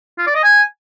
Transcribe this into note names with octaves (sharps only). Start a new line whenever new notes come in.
F4
D5
D#5
G#5